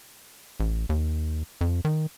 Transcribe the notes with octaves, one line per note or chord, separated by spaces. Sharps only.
A1
D#2
F2
D#3